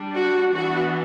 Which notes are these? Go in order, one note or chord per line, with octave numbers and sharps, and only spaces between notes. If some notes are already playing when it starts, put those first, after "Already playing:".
Already playing: G3 D4
F#4
E3 B3 D4 F#4